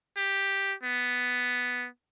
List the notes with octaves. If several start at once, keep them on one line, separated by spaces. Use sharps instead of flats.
G4
B3